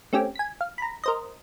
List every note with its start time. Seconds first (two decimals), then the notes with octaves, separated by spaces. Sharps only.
0.13 A3 C4 C#4 G4
0.35 G#5 B6
0.61 F5
0.78 A#5 B5
1.04 A#4 C5 D#5